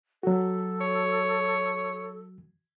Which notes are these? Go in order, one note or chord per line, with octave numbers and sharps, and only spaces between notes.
F#3 F#4 A4
C#5